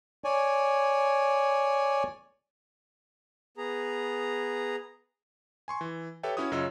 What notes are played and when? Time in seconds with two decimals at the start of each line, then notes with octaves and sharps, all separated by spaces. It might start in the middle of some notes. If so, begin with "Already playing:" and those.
0.24 C#5 D5 G#5
3.57 B3 G#4 A#5
5.68 G#5 C6 C#6
5.81 E3
6.23 G4 A4 B4 C#5 E5 G5
6.37 C#4 E4 F#4 C#5 D#6
6.51 F#2 C#3 F4 C#5 D#5 E6